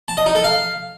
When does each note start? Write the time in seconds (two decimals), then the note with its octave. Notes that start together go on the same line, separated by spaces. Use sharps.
0.08 A5
0.17 D#5
0.26 D#4
0.35 A4
0.44 F5